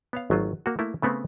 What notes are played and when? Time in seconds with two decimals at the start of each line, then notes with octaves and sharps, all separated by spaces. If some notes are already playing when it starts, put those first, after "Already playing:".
0.13 B3 C#5 F5
0.30 G#1 F#3 A3 F4
0.66 A#3 F#4
0.79 A3 A#3 E4
1.02 C#3 A3 B3 C4